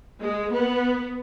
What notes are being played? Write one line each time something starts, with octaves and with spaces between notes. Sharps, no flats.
G#3
B3